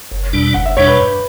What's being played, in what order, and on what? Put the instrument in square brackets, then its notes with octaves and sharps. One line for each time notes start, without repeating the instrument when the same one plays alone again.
[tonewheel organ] F#1
E2 B2 G3 D4
[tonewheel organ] F#1 [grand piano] F#5
[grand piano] E5
[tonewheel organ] E2 B2 G3 D4 [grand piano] C#5
[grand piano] B4
[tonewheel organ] G2